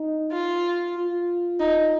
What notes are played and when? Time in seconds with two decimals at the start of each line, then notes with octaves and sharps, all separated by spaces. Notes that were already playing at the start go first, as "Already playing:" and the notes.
Already playing: D#4
0.32 F4
0.96 F4
1.60 D#4